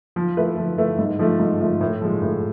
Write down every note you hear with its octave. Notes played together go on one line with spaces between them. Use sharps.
F3
A3 E4 B4
F3
A3 E4 B4
G#2
F3 A3
G#2
F3 A3
A2
F3 G#3
A2